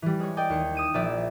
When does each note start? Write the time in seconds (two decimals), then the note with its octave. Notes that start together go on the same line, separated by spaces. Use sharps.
0.02 E3 G3
0.20 G#3 C#5
0.37 G#4 D5 D#5 G5
0.50 D#2 C#7
0.75 D#6 D#7 E7
0.94 A#1 F3 D5 E5